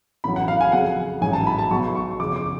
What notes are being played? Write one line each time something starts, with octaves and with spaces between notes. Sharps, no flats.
A1 A2 F#3 B5
F#5
F5
G#5
F2 C#3 F#3 F#5
A1 G#2 F#3 G#5
A5
B5
A5
B1 B2 F#3 C#6
C#6
F#1 F2 C#3 F3 D6
D6